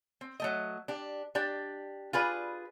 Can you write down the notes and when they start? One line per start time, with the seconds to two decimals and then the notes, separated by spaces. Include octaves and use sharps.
0.21 C4
0.40 F#3 A3 D#5
0.88 D4 G4
1.35 D4 G4 D5
2.13 F4 G#4 B4 D5